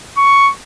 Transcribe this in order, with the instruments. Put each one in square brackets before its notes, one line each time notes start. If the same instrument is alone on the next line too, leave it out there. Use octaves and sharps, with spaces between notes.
[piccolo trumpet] C#6